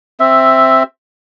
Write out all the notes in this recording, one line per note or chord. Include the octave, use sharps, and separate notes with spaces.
C4 E5